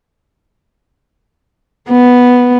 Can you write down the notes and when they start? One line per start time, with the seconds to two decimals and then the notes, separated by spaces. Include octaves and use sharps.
1.89 B3